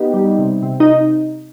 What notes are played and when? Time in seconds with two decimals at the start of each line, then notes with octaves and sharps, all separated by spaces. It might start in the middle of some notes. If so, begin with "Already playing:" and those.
Already playing: B3 D#4 G4
0.14 G3
0.38 C3
0.63 C3
0.80 D#4